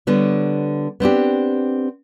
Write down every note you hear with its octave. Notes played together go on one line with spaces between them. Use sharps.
D3 G3 B3 C#5
B3 C4 D4 G4